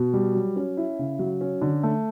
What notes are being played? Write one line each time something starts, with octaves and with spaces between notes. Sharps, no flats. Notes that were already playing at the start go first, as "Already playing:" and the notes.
Already playing: B2
G3
F#3
C#4
E4
C#3
F#3
C#4
D3
A3